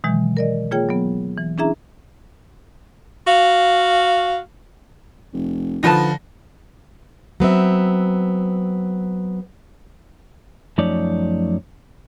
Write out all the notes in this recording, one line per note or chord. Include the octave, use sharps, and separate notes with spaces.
B2 D#3 E3 F#3 G#3
A#4 D5 D#5
A#3 F4 G#4 C#5 G5
F#3 B3
E3
C#4 D4 E4 G#4 E5 A#5
F#4 F5
F1
D3 F3 D#4 B4 A5 A#6
F#3 B3 C4 E5
F#2 F3 A3 D#4 C#5 D5